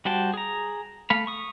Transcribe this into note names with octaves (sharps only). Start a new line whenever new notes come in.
G3 F#4 C5 G5 A5
G#4 A#5
A3 F5 B5
C#6 D#6